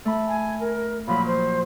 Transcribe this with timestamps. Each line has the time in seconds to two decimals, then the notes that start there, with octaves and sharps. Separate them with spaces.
0.05 A3 B5
0.28 G#5
0.60 A#4
1.07 A#2 F3 F#3 B5
1.27 C5